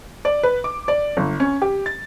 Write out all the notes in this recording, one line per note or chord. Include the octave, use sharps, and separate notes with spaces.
D5
B4
D6
D5
G1
C#4
G4
A6